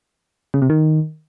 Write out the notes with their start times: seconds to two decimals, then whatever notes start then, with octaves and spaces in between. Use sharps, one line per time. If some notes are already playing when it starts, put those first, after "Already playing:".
0.54 C#3
0.62 C3
0.70 D#3